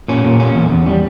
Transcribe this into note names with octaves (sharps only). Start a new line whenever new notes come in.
A#2 C#4
A#2
C#4
E2
E2
G3